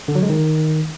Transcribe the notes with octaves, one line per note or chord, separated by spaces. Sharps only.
D3
F#3
G#3
D#3